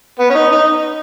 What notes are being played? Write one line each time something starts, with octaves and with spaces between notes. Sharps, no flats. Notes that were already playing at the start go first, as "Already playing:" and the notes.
B3
C#4
D#4
D#4